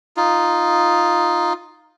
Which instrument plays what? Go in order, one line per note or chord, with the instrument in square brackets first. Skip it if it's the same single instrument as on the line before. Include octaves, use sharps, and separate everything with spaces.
[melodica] D#4 F4